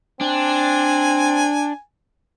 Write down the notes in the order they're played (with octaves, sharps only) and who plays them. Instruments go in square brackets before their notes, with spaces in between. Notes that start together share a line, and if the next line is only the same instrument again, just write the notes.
[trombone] C4 [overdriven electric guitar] D4 [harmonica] G#5